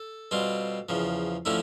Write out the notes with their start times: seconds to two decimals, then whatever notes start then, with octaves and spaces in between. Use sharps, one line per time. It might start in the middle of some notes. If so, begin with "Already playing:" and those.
Already playing: A4
0.31 B2 G3 C4 F4
0.89 E2 C#3 F3
1.45 D3 F3 A3 C#4 E4